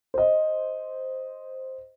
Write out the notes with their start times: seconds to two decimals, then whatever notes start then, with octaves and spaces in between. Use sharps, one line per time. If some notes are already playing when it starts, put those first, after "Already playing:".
0.14 C5 D#5